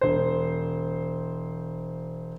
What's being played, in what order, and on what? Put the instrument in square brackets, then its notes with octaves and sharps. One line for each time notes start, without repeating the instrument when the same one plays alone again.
[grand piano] E1 C5